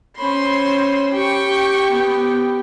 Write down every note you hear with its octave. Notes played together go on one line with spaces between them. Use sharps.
C#4 C5 B5 C6
G4 G5 C#6
B3 G5